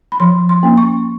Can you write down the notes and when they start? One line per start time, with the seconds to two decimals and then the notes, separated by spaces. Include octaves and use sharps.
0.12 B5
0.20 F3 C6
0.49 C6
0.63 A#3 C#4
0.77 C#6